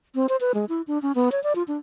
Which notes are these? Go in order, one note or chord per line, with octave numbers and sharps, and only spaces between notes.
C4
C5
B4
G#3
E4
D4
C#4
B3
C#5
D5
F4
D4